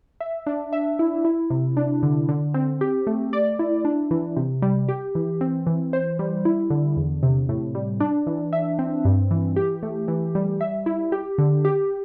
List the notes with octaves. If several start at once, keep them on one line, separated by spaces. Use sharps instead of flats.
E5
D4
E5
E4
E4
C3
D4
D3
D3
C4
G4
A3
D5
E4
D4
E3
C3
G3
G4
E3
C4
E3
C5
G3
E4
D3
E2
C3
A2
G3
D4
E3
E5
C4
G2
E3
G4
A3
E3
G3
E5
E4
G4
D3
G4